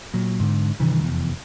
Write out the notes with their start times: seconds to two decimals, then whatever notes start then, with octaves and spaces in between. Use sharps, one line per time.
0.14 A#2 F#3
0.40 G#2 D3
0.80 G2 C3 D#3 E3
1.02 F1 E2